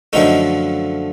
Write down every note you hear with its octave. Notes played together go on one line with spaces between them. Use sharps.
F#2 D3 F3 A3 D#4